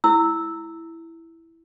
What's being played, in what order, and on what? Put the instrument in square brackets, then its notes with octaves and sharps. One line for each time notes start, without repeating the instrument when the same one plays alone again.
[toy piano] E4 E6